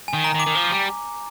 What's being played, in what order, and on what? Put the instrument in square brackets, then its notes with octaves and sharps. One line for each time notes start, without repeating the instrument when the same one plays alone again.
[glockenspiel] G#5
[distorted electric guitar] D#3
[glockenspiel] A#5
[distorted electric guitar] D#3
[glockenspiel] D6
[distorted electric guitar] D#3
F3
G3